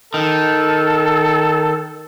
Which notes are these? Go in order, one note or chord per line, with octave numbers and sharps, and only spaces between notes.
D#3 A4